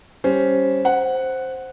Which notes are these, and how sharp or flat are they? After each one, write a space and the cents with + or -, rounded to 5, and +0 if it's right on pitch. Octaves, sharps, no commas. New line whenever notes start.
G3 +0 C#4 +5 C5 +0
C5 +0 F#5 +0